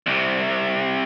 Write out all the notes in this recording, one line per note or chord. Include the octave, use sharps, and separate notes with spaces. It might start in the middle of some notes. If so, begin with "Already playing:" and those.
C2 C3